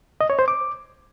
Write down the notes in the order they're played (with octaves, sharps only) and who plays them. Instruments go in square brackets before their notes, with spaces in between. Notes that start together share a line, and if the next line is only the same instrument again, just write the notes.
[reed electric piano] D#5
C#5
C5
D6